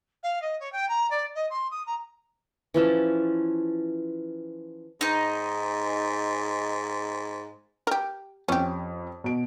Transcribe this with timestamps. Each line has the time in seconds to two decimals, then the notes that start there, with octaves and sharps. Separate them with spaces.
0.23 F5
0.41 D#5
0.59 C#5
0.72 G5
0.88 A#5
1.10 D5
1.35 D#5
1.50 C6
1.71 D#6
1.86 A#5
2.74 E3 F3 C#4 A5
5.01 G#2 D#4 D#5
7.87 G4 A#4
8.48 F2 C4 C#4 G4
9.24 B2 D7